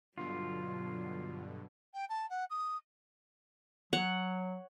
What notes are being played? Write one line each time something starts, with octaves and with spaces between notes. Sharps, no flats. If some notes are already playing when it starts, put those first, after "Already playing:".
G2 B2 D3 F#3 F4
G5
A5
F#5
D#6
F#3 C#5 F#5